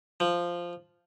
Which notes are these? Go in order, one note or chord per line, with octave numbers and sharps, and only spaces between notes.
F3